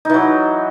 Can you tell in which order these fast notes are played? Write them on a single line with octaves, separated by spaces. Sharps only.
D#4 E3 F#3